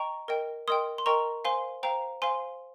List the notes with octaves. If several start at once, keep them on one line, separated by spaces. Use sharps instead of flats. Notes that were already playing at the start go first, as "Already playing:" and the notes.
Already playing: D#5 G5 A#5 C#6
A#4 D#5 G5
A#4 D#5 G5 C6 D#6
C6
A#4 D#5 G5 A#5 C#6
C5 F5 G#5 C6
C5 F5 G5 A#5
C5 F5 G#5 C6